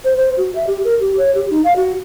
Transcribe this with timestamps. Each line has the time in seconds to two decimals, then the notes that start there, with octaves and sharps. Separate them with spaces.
0.05 C5
0.17 C5
0.37 F#4
0.55 E5
0.67 G4
0.84 A#4
1.00 G4
1.18 C#5
1.35 G4
1.51 D#4
1.64 F5
1.76 F#4